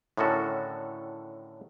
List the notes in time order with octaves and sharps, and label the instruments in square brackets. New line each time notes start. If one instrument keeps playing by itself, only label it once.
[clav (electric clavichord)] A2 D3 D#3 C#4 F#4 A4